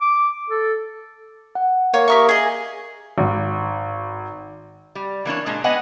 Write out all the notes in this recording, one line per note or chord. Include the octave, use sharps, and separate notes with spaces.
D6
A4
F#5
A#3 C#5
G4 A#4 E5 C#6 D#6
G#4 D#5
G#1
G3
E3 A#3 D4 C#5
A#2 G#3 D4
B3 D4 B4 D#5 F#5 G#5